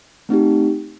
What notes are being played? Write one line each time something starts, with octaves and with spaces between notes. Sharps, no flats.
A3 C4 D#4 G4